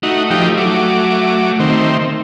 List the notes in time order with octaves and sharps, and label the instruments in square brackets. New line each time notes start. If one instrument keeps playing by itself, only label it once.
[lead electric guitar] A3 [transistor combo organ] D#4 F#4
[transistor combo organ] F3 D#4 G4
F#3 D6
D#3 C4